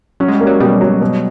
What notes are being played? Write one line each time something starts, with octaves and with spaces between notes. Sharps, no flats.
F#3 C#4
G#3
G3
A#3
F#3
B2 G3
F#3
B2